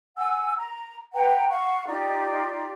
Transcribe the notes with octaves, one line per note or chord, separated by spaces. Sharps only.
F#5 G#5 E6
A#5
B4 F#5 G5 A#5
F5 F#5 C#6
D#4 F4 G4 D5